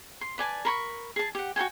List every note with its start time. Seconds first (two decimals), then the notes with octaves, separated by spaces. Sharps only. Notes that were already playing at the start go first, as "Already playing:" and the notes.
0.21 C6
0.38 B4 D5 G#5 A5
0.65 A#4 B5 C#6
1.16 G#4 A5
1.35 G4 F#5
1.56 F#4 A4 G5 G#5